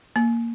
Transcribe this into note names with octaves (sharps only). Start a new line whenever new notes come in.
A#3